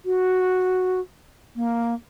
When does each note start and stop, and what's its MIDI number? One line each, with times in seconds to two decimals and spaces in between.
0.05 1.00 66
1.55 1.94 58